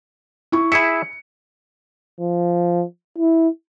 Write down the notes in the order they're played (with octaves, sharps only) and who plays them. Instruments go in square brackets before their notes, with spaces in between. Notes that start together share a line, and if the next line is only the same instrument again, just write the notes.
[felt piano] E4 C#6
[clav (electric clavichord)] E4 G#4 E5 [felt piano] C#7
[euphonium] F3
E4